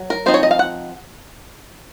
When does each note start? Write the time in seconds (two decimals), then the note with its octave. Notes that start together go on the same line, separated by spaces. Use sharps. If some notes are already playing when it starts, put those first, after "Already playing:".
Already playing: F#3
0.10 A#4
0.26 F3 C4 D#4 C5
0.34 C#5
0.43 D#5
0.51 F5
0.59 F#5